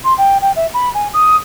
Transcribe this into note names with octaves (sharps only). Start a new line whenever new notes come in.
C6
G5
G5
E5
B5
G#5
D#6